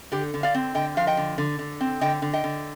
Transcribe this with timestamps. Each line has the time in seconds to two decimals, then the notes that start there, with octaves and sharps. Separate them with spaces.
0.12 D3 G4
0.34 D3
0.43 D5 F5
0.54 C4
0.75 D3 D#5 G5
0.97 F3 F5
1.07 D#5 G5
1.17 D3
1.38 D3
1.59 D3
1.81 C4
2.01 D3 D#5 G5
2.22 D3
2.33 D#5 G5
2.44 D3